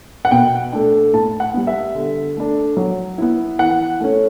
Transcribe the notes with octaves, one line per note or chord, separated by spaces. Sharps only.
F#5
B2 G5
A3 D4
A2 A5
F#5
G3 B3
E5
D3
A3 D4
F#3
B3 E4
E3 F#5
A3 C#4